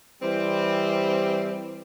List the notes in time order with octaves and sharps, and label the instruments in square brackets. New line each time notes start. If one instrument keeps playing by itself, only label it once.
[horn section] E3 G3 C4